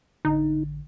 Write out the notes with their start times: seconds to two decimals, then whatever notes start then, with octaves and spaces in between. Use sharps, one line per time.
0.25 A1 D3 D#4